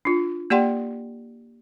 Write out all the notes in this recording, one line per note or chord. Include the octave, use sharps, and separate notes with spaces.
D4 F4
A#3 G4 D5 F#5 G5 C6